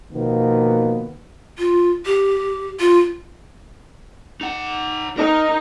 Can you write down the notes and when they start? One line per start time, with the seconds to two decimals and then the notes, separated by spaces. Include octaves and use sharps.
0.13 B2 D#3 F3 A#3 B3
1.59 F4
2.06 G4
2.80 F4
4.41 D#4 F#5
5.17 D#4 A#4